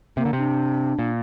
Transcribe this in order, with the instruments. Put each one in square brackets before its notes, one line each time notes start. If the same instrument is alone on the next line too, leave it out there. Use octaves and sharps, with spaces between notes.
[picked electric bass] C3 [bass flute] A#3
[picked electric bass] D3
[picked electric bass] C3 [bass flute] D4
[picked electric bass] A#2